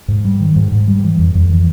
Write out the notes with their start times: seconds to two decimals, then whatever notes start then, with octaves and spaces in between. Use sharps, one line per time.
0.08 G#2
0.25 G3
0.41 D#3
0.56 G#2
0.72 G#2
0.88 G3
1.04 E3
1.19 F2
1.35 F2
1.50 E3